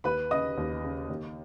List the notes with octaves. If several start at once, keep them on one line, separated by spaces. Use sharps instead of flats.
D#2 B4 B5
C#3 D#5 D#6
D#2
C#3
D#2